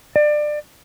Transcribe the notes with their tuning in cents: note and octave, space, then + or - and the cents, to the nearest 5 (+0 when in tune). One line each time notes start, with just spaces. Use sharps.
D5 +25